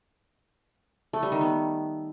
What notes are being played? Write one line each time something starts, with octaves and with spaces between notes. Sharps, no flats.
A3
G3
D#3
B3